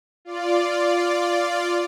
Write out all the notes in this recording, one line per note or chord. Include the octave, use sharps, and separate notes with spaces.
F4 D5